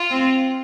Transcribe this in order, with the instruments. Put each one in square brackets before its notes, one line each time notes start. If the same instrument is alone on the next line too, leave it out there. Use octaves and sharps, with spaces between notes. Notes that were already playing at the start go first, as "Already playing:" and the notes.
Already playing: [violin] F4
[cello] C4